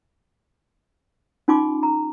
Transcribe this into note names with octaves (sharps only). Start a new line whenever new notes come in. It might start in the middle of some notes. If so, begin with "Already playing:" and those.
C#4 D#4 F4 G#5 C6 D6
A#5